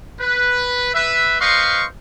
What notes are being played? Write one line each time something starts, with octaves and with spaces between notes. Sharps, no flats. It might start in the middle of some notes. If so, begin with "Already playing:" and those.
B4
B4 E5
B4 C5 D#5 F5 C6 C#6